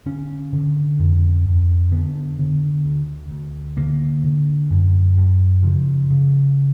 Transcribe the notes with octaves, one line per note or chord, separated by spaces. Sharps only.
D3 C#4
D3
F2
F2
D3 B3
D3
D2
D2
D3 A#3
D3
F#2
F#2
C#3 F3
C#3